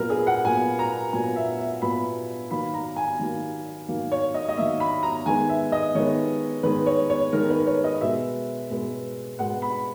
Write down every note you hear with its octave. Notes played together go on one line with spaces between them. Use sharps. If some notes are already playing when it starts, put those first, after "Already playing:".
Already playing: A#2 F#3 B3 A#4 B4
G#4
F#5
A#2 F#3 B3 G#5
A#5
A#2 F#3 B3 G#5
E5
E5
A#2 F#3 B3 B5
D#3 F#3 A#3 B5
A#5
G#5
D#3 F#3 A#3
D#3 F#3 A#3
C#5
D#5
D#5
D#3 F#3 A#3 E5
B5
A#5
D#3 G#3 B3 G#5
E5
D#5
D#3 G#3 B3 C#5
D#3 G#3 B3 B4
C#5
C#5
D#3 G#3 B3 A#4
B4
C#5
D#5
B2 G#3 B3 E5
B2 G#3 B3
B2 G#3 B3 F#5
B5